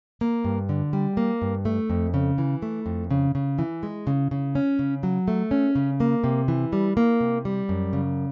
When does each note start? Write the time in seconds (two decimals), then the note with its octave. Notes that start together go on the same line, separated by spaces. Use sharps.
0.21 A#3
0.44 G2
0.69 D3
0.93 G3
1.17 A#3
1.42 G2
1.65 A3
1.90 F2
2.14 C#3
2.38 E3
2.62 A3
2.86 F2
3.11 C#3
3.35 C#3
3.59 E3
3.83 G#3
4.07 C#3
4.31 C#3
4.55 C#4
4.79 C#3
5.03 F#3
5.28 A3
5.51 C#4
5.75 C#3
6.00 A#3
6.24 C3
6.48 E3
6.73 G3
6.97 A#3
7.20 C3
7.45 G3
7.69 F#2
7.93 C#3